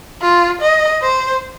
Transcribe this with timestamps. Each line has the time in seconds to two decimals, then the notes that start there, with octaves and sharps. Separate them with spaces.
0.22 F4
0.62 D#5
1.02 C5